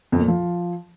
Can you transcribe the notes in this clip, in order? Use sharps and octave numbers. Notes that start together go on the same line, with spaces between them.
F2
A#2
F3